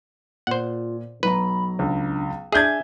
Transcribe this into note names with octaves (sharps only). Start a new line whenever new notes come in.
A#2 F4 C5 F#5
B1 F#3 B4 A#5 B5
C#2 D4
D4 G#4 E5 G#5 G6 G#6